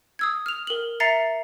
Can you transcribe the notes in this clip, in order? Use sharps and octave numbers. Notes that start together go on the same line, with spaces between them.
D#6 E6 G#6
F6 F7
A#4 F#7
E5 A#5 A6 C7 C#7